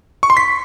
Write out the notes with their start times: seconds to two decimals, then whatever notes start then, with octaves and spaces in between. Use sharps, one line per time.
0.23 C#6
0.30 C6
0.37 B6